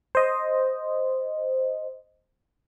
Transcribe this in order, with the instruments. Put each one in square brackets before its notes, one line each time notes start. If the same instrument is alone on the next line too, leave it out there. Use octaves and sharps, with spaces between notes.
[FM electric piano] C5 D#5